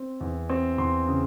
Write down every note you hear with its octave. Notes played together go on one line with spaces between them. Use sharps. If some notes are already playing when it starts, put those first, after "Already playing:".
Already playing: C4
E2
C4
E2 C6
C#3